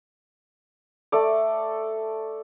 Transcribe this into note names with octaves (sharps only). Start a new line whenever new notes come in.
A3 A4 D5